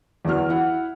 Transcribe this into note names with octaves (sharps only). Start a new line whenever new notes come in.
E2 E3 F#4 F6
E4 F#5